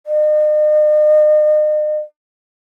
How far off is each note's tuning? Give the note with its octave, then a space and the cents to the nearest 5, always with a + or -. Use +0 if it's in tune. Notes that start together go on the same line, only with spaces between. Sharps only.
D#5 -40